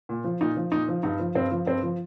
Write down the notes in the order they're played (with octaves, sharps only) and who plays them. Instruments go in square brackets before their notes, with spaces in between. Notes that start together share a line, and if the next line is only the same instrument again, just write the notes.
[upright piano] A#2
F3
A#2 D#4
F3
A#2 D#4
F3
G2 D#4
F3
G2 C4
F3
G2 C4
F3